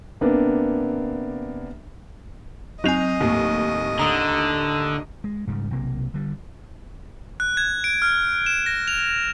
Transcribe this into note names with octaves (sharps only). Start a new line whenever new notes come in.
C3 A#3 B3 D4
F#3 C4 D#4 D#5 G#5 F7
D#2 A2
D3 A#5 D#6
G#3
G#2 C#3 G3
B1 C3 A#3
D3 G3
F#6
G#6
D7
F6
E7
A#6
F7